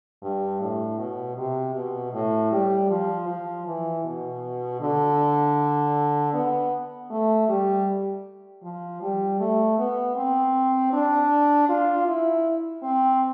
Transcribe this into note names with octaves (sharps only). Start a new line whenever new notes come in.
G2
A2
B2
C3
B2
A2
G3
F3
F3
E3
B2
D3
B3
A3
G3
F3
G3
A3
B3
C4
D4
F4
E4
C4